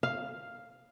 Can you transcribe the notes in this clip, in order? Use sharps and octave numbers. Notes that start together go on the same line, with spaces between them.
F5